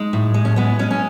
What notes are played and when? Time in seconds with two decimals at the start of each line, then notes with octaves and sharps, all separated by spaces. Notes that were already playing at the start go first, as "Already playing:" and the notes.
Already playing: G#3 D#4
0.13 A2
0.34 G#3
0.45 C#4
0.56 G#3 B3
0.79 G#3 C#4
0.91 C#4